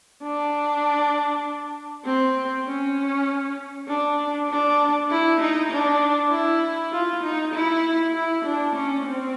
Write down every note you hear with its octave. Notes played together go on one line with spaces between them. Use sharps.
D4
C4
C#4
D4
D4
E4
D#4
D4
E4
F4
D#4
E4
E4
D4
C#4
C4